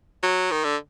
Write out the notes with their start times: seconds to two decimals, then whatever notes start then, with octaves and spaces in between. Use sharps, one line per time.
0.23 F#3
0.51 D#3
0.64 D3